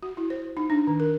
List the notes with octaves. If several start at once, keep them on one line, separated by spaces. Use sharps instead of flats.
F#4
E4
C5
D#4
D4
D#3
A#4